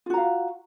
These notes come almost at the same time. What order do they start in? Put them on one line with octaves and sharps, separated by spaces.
F4 F#4 A#5 F5